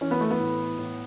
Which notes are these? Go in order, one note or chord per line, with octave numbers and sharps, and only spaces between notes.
E3 C#4
B3
A3
B3
A2
A2